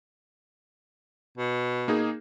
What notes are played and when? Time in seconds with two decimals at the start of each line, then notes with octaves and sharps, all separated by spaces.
1.38 B2
1.88 A#3 D#4 G#4